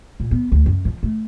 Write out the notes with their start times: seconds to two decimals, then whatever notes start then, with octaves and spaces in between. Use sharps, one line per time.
0.20 A#2
0.31 B3
0.52 D2
0.66 F#2
0.85 F3
1.03 A3